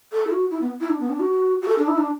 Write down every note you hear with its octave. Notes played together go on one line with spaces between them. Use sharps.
A4
E4
F#4
E4
B3
E4
D4
B3
D4
F#4
F#4
A4
D4
E4
D4